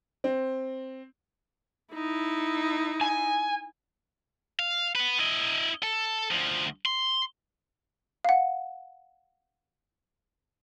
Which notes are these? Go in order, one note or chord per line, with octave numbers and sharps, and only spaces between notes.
C4
D#4 E4
G#5
F5
B3 B4
E4 D#5
A4
D2 F3
C6
F5 F#5